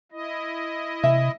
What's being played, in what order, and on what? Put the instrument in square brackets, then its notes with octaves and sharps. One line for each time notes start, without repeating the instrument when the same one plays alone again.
[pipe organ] E4 D#5
[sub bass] C3 [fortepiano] E5